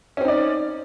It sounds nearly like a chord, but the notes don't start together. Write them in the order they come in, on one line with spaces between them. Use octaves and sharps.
C#4 C4 D#4 D5